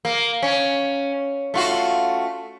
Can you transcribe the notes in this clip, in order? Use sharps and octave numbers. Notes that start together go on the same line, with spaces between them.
A#3
C#4
A3 F4 F#4